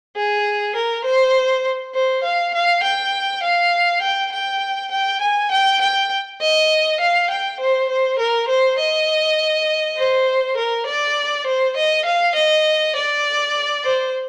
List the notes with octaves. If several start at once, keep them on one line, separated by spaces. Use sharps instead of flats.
G#4
A#4
C5
C5
F5
F5
G5
F5
G5
G5
G5
G#5
G5
G5
D#5
F5
G5
C5
C5
A#4
C5
D#5
C5
A#4
D5
C5
D#5
F5
D#5
D5
C5